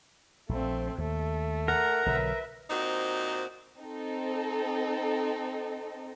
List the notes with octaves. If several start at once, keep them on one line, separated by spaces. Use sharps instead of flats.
A#1 F3 A3 C4
D#2 A3
A#4 F#5 A#5
B1 D3 F#3 B4 E5
A#2 C4 D#4 F#4 C5
C4 D#4 A4